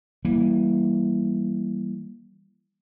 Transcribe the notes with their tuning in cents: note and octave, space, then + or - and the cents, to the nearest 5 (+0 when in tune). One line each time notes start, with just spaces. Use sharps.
E3 +0 G3 +0 A#3 +25